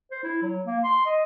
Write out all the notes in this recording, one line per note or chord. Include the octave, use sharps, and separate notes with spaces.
C5
E4
F#3
A#3
C6
D#5